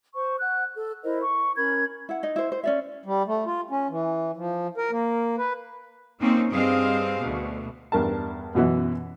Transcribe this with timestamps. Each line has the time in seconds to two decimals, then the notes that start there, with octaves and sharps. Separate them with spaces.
0.15 C5 C#6
0.41 F#5 F#6
0.74 A4
1.03 E4 A#4 C5 D#5
1.22 C#6
1.57 C#4 A#4 B5 G#6
2.09 E4 F#5
2.23 D#4 D#5
2.36 E4 C5
2.52 C5
2.64 C#4 D5 E5
3.05 G3
3.27 A3
3.46 F4
3.70 C#4
3.90 E3
4.37 F3
4.78 A#4
4.91 A#3
5.38 B4
6.20 A#3 C4 C#4 D#4
6.50 G2 C4 G#4 D#5 F5
7.20 D2 B2
7.92 E2 G2 A#4 A5
8.55 F#2 B2 E3 B3